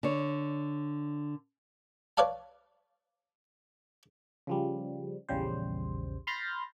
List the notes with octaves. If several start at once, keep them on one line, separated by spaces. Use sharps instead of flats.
D3 C#5
B4 C#5 D5 F5 A5
C#3 F3 G3
A#1 E2 C#3 G3 C5
B5 C6 F6 G6 A6 A#6